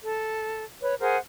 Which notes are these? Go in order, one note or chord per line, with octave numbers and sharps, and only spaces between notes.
A4
B4 C#5
G#4 A#4 C5 F#5